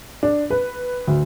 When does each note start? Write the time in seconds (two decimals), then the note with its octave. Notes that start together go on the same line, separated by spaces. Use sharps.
0.23 D4
0.50 B4
1.07 D2